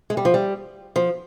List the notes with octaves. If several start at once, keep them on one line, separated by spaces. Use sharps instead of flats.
G#3
G3
F3
G3
F3